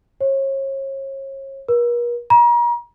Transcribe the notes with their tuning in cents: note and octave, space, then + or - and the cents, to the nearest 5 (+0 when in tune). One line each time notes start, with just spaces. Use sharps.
C#5 -35
A#4 +45
A#5 +40